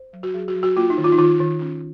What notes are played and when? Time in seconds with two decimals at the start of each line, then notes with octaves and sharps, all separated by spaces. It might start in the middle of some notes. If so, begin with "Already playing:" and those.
Already playing: C5
0.13 F#3
0.23 F#4
0.34 F#3 G#4
0.48 F#4
0.55 F#3
0.63 F#4
0.77 A#3 F4
0.90 D#4
0.98 D#3
1.04 F4
1.12 D#4
1.18 D#3 F4
1.40 D#3
1.61 C#4